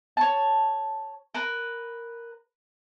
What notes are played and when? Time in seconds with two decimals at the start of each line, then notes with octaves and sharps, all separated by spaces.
0.17 C#5 A5
1.34 A#4 B4